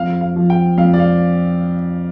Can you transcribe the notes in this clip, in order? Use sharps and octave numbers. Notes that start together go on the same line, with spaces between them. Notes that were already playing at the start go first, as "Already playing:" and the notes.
Already playing: F2 F5
F5
F3
G5
F2 F5
D5
F5